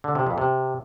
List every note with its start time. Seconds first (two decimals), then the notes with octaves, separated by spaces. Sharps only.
0.04 D3
0.15 C3
0.26 F2
0.38 C3